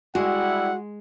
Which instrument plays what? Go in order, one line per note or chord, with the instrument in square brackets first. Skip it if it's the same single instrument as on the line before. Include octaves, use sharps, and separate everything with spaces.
[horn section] G3 E4 [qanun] G#3 [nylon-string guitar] F#4 [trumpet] F#5